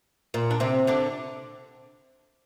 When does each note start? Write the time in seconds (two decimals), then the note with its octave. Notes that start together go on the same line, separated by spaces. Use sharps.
0.34 A#2
0.51 D4
0.60 C3 C4
0.87 D3 D4